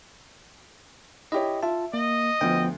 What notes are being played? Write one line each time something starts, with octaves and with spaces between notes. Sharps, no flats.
E4 G4 C#5 D#5
F4 E5 A5
A#3 D#5
D2 F3 B3 G5